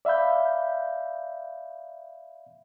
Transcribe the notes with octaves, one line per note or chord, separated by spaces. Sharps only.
D5 E5 F5 B5 G6